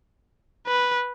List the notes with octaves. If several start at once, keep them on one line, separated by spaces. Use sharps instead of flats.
B4